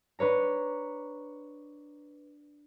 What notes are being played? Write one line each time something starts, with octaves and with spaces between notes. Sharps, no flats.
D4 B4 C#5 A#5